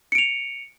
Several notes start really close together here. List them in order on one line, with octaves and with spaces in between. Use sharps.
C#7 D7 F7